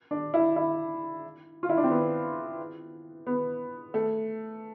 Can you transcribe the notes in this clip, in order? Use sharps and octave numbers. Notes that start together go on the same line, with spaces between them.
D4
E4
E4
F4
E4
D4
C4
B3
B3
A3